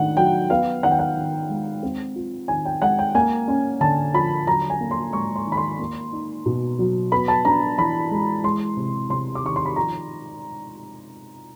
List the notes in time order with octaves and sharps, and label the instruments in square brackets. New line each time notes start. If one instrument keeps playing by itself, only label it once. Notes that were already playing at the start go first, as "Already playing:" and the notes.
Already playing: [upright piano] D#3 A3 D4 F#5
F#3 G5
B3 F5
D#3 F#5
G5
F#5
D#3
G#3
C4
F4
D#3 G#5
G5
G#3 F#5
G5
A#3 G#5
C#4
D3 A5
F3 B5
F#3 A#5
G#5
A#3
C6
G#2 C#6
C6
D#3
B5
C6
A#3
D#4
B2
F#3
B3 B5
A5
D4 A#5
E3 B5
G#3
G#3 C6
C3
C3 C6
D6
D#3 C#6
C6
B5
F3 A#5